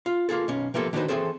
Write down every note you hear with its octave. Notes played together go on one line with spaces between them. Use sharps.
F4
A#3 F4 G#4 A4
B1 C#4
C3 F3 A#3 B3 G4 A4
D#3 D4 D#4 F#4 B4 C5
E3 F3 C4 G#4 A4 C5